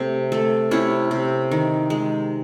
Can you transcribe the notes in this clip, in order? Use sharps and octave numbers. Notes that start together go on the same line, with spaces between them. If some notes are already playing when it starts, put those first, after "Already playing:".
Already playing: C3 A3
A3
C3 C#4 E4
C3
D#3
G#3